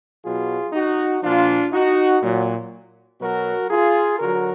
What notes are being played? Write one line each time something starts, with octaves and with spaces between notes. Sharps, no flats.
B2 F#3 F4 G#4
D#4 F#4
A#2 F3 D4 F4
D#4 F#4
A#2 F#3
B2 F#3 F#4 A#4
F4 G#4
D3 F#3 F#4 A#4